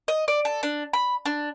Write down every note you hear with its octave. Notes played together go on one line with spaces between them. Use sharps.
D#5
D5
A4
D4
B5
D4